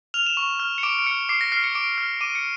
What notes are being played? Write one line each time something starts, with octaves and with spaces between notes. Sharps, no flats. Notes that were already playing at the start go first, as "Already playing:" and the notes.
F6 F7
E7
C#6
F6
C#7
D6 D7
D7
F6 C#7
D6 C7
A#6
F6 C7
C#7
D6 D7
F6
D6 D#7
C#7